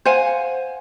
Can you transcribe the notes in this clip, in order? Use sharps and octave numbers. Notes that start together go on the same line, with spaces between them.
C5 F5 F#5 G#5